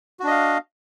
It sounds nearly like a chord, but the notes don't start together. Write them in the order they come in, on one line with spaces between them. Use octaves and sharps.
F#4 D4 D#5 F5